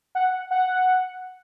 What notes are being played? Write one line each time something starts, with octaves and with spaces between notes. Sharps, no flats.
F#5
F#5